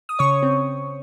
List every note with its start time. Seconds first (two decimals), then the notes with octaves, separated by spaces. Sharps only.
0.09 D#6
0.19 C#3 C#5 C#6
0.43 C4